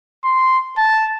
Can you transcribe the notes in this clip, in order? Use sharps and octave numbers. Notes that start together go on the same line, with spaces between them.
C6
A5